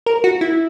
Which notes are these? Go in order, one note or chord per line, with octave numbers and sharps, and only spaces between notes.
A#4
F#4
E4